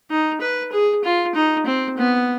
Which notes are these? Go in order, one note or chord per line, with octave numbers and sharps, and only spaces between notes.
D#4
B4
G#4
F4
D#4
C4
B3